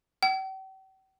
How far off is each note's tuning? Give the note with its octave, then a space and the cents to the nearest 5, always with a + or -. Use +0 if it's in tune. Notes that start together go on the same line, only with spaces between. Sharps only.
G5 -45